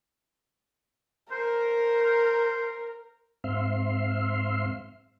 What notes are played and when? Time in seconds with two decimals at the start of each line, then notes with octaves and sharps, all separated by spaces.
1.31 A#4 C5
2.02 C5
3.44 G#2 C4 E5 F5 C6